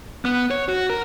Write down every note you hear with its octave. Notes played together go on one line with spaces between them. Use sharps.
B3
C#5
F#4
A#4